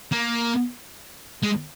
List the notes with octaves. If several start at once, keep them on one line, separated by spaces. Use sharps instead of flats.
A#3
G#3